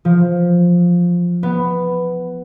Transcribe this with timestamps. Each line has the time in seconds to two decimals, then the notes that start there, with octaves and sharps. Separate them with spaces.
0.05 F3
1.43 B3